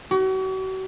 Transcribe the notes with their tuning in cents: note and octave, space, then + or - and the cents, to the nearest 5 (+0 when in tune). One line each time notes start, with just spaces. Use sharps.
F#4 +40